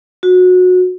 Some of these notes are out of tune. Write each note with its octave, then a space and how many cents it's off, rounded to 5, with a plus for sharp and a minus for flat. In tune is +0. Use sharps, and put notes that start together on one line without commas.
F#4 -25